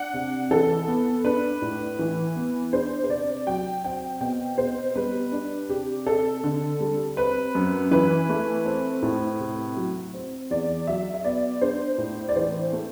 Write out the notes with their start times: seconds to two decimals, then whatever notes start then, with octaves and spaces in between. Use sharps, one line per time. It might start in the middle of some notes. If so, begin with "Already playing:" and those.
Already playing: D4 F#5
0.14 C3
0.51 E3 A4
0.87 B3
1.24 D4 B4
1.62 A2
1.99 E3
2.36 B3
2.73 D4 C5
3.04 C5
3.10 C3 D5
3.47 F#3 G5
3.84 C4 G5
4.21 B2 G5
4.58 B2 C5
4.95 G3 B4
5.32 D4
5.69 C3 G4
6.06 C3 A4
6.44 D3
6.80 G3
7.17 C4 B4
7.55 F#2
7.91 E3 B4
8.29 A3
8.65 C4
9.03 A2
9.40 C3
9.77 F#3
10.14 C4
10.51 E2 D5
10.87 F#3 E5
11.14 E5
11.24 B3 D5
11.61 D4 C5
11.98 A2
12.29 D5
12.36 E3 C5
12.73 A3